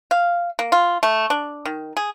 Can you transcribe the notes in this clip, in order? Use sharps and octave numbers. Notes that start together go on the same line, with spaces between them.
F5
A#3
F4
A3
D4
D#3
G#4